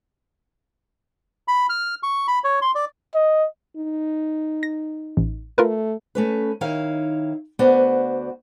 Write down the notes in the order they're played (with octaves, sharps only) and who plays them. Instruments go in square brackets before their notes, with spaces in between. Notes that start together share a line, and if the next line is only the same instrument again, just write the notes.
[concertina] B5
F6
C#6
B5
C#5
C6
D5
[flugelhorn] D#5
[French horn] D#4
[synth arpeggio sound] A#6
A1
[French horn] A3 [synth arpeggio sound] F4 A#4 B4
[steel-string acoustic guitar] A3 C#4 B4
D#3 D#4 E4 C#5 F5
D2 B3 F#4 C5 D5 F#5